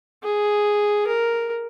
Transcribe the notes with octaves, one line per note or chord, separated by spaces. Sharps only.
G#4
A#4